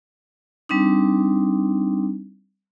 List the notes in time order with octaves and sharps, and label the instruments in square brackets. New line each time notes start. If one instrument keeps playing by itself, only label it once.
[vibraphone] G3 C4 D4 D#4